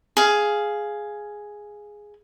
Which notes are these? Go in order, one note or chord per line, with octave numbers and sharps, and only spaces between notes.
G#4 F5